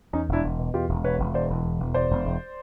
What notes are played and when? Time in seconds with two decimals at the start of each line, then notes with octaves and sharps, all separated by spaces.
0.13 E2 C#4 D#4
0.29 E1 D4 E4
0.44 E1
0.59 B2
0.74 E2 F4 G4
0.89 E1
1.04 B2 B4 C#5
1.19 E1
1.34 E2 C5 D5
1.50 E1
1.65 E2
1.79 E1
1.94 E2 C5 D5
2.11 E1
2.25 E1